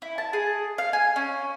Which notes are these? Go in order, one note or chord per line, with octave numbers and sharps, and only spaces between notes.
E4
A5
G#4
F5
G#5
C#4